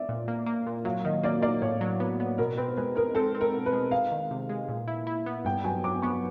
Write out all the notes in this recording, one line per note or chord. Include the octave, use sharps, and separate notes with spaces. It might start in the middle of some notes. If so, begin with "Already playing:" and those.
Already playing: D5 E5
A#2
A#3
A#3
A#2
F#3 F5
D#3 D#5
A#3 D5
A#3 D5
A2 C#5
F#3
B3
B3
B2 A#4
C4 B4
G#3 B4
G#3 A#4
C4 A4
C4
A#4
B2
B4
G#3
G#3 F5
D#3
C3
G#3
A#2
E4
E4
B3
G2 G5
F#3 G#5
F#3 D6
B3 C#6